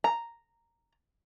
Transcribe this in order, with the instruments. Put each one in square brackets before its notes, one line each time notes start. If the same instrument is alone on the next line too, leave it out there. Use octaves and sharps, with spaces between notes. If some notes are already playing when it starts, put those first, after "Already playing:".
[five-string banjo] A#5